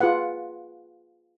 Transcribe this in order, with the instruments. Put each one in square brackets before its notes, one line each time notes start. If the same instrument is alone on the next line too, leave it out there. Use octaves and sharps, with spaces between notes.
[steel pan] F4 G#4 B4 F#5